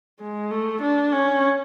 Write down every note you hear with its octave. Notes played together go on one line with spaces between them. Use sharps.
G#3
A3
D4
C#4